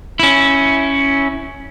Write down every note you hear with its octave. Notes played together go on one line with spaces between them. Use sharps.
C#4 E4